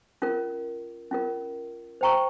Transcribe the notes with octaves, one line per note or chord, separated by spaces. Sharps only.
C#4 F4 A#4
C#4 F4 A#4
C5 G5 A#5 C#6